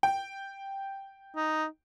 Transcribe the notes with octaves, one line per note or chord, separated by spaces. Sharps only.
G5
D#4